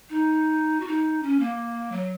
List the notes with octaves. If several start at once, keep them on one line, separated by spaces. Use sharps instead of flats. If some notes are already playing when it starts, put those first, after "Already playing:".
D#4
F#4
D#4
C#4
A#3
F#3